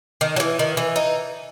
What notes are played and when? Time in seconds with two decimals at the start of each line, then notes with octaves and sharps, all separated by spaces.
0.21 D#3
0.36 F#3
0.40 E3
0.59 D#3
0.77 E3
0.96 D#4